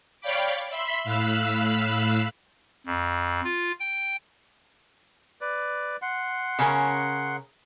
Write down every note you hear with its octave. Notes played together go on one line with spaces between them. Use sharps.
C#5 D5 F5 G5 B5 D6
E5 B5 C6
A2 F5 B5 E6 F#6
F2
F4
G5
B4 D5
F#5 C6
C#3 C#4 A#4